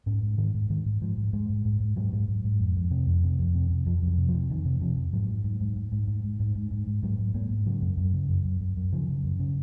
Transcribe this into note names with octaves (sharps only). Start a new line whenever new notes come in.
G#2 C#4
G#2
G#2 D#3
G#2
G#2 D#3
G#2
G#2 F3
G#2
G#2 G#3
G#2
G#2
G#2
G#2 F#3
G#2
G#2
G#2
F2
F2
C3
F2
C3
F2
C3
C3
F2 F3
F2
F#3
C3
F3
C3
F2 D#3
C3
C3 F3
F2
G#2 F#3
G#2
G#2
G#2
G#2
G#2
G#2
G#2
G#2
G#2
G#2
G#2
G#2 F#3
G#2
G#2 A#3
G#2
C#3 F#3
F#2
F#2
C#3
F#2
F#2
F#2
F#2
C#3 F3
C#3
F#2
C#3